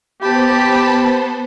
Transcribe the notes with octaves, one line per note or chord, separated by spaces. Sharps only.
B3 G4 C5 A5 B5